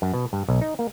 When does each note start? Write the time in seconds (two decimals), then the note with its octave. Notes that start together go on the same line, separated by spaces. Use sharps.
0.02 F#2
0.14 B2
0.33 G2
0.48 B1
0.61 D#4
0.79 A#3